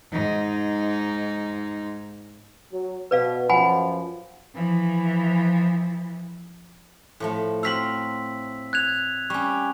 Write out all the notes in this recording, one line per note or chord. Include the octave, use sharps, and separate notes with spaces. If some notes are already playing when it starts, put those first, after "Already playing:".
G#2 D#4
F#3
B2 B4 D5 F5
F#2 F3 F#5 G#5 B5
E3 F3
A2 F3 A3
C4 F#4 F5 E6 B6 F#7
F#6 G#6 F7
G3 C#4 C#6